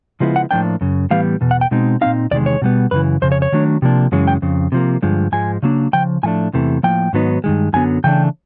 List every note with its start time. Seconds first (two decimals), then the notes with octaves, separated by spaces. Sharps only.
0.20 C#3 F3 G#3 B3 E4
0.36 F#5
0.51 A2 F3 A#3 D4 G5
0.81 F#2 C#3
1.11 A2 E3 G3 B3 F5
1.41 E2 B2
1.51 F#5
1.61 G5
1.71 B2 G#3 C4 D#4
2.01 A#2 G3 C4 D#4 F5
2.31 E2 C3 D#3 G#3 D5
2.46 C#5
2.62 B2 G3 B3
2.91 F#2 C#3 E3 B4
3.22 F2 C#3 C5
3.32 C#5
3.42 C#5
3.52 D#3 F#3 A3 D4
3.82 C3 F3 A#3 D4
4.12 F#2 C#3 E3 G#3 C#4
4.27 G5
4.42 F2 C#3
4.72 C3 F3 A#3
5.02 G2 D3 F3 G#3
5.32 G#2 F3 G#3 G#5
5.63 C#3 F#3 A#3 D4
5.93 C#3 F3 G5
6.23 A2 F3 A3 D4 G#5
6.53 E2 C3 E3 A3
6.83 A2 F3 A#3 G5
7.13 G#2 D#3 F#3 B3 D#4
7.44 G2 D#3 G#3
7.73 F#2 D3 F#3 B3 G#5
8.04 C#3 E3 A3 D4 G5